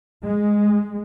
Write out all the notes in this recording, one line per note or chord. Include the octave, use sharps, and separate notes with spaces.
G#3